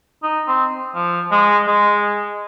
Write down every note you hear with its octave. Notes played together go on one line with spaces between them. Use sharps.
D#4
C4
F3
G#3
G#3